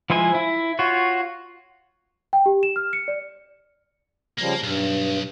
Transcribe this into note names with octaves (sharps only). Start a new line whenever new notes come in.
F3 G#3 E4 C5 G#5
E4
F4 F#4 C#5
G5
G4
E7
F6
C#7
D5
C#3 F3 G3 A#3
B1 G2